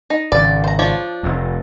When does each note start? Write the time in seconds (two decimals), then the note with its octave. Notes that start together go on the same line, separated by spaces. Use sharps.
0.10 D#4
0.32 G#1 C#3 D5
0.64 C5 A#5
0.79 F3 D4 C#5
1.23 F1 F2